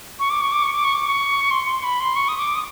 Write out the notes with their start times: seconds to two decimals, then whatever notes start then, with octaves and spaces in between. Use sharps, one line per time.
0.19 C#6
0.30 D6
0.41 C#6
0.52 D6
0.63 C#6
0.73 D6
0.84 C#6
0.95 D6
1.06 C#6
1.51 C6
1.67 C6
1.83 B5
2.00 C6
2.16 C#6
2.28 D#6
2.38 D6
2.55 D#6